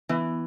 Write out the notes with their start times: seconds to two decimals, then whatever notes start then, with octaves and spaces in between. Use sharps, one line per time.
0.09 E3 B3